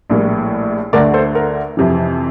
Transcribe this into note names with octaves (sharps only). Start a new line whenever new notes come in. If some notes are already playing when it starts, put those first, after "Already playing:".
A#1 A2 G3 A#3
D2 D3 A3 A#4 D5
A4 C5
A#4
F2 C3 E3